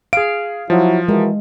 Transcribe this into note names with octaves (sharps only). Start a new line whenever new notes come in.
G#4 F5 D7
F3 F#3 E4
E3 G#3 F#4 A#4